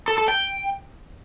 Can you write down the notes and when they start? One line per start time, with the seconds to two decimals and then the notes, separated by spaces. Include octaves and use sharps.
0.08 A4
0.18 A4
0.28 G5